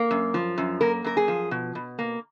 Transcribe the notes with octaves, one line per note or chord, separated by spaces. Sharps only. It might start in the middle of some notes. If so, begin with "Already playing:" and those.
Already playing: A#3
F#2
F3
F#2
A#3 A#4
F#2 A#4
G#4
F3
B2
B2
A#3